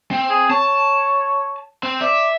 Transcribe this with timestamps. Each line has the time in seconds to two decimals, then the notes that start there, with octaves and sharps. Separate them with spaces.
0.11 C4
0.30 G#4
0.51 C#5 A5
1.83 C4
2.01 D5 E5